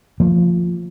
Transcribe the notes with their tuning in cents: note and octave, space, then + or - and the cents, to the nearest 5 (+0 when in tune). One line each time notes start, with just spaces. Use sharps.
F3 +0 A#3 -45